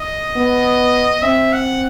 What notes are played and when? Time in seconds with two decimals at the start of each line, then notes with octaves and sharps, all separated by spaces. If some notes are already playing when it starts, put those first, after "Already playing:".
Already playing: D#5
0.36 B3
1.22 C4 E5
1.52 F#5